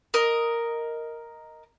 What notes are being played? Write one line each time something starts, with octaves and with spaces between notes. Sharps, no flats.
A#4 D#5